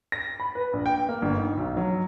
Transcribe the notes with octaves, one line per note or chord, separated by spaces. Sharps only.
A#6
B5
B4
A#1
G5
A#3
G1
D#4
B1
F#3